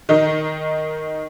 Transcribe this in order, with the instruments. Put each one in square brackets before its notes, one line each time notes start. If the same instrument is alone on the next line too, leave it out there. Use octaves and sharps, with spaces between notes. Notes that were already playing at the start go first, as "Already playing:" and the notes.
[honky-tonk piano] D#3 D#4